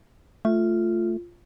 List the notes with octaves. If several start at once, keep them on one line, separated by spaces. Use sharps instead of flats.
A3 F4